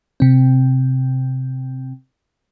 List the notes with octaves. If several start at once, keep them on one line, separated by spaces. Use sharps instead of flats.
C3 C4